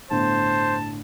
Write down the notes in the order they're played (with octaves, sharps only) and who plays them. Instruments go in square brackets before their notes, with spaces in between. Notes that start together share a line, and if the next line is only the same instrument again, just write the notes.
[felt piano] G1 A2 D3 [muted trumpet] C5 [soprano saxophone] A5